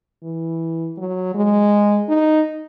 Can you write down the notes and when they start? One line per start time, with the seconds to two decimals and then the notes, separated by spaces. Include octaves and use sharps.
0.23 E3
0.97 F#3
1.34 G#3
2.09 D#4